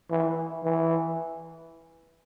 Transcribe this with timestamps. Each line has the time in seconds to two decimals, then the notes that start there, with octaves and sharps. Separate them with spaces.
0.10 E3
0.64 E3